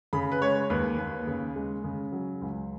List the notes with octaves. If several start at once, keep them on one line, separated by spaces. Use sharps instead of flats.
C#3 B5
B4
G#3 C#5
D#2 B4
D#2
C#3
G#3
C#3
F#3
C#2